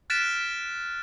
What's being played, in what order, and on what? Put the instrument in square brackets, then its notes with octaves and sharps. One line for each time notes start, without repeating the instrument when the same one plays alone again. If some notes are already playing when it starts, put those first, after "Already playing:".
[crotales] F6 F#6 A6 B6 D7 E7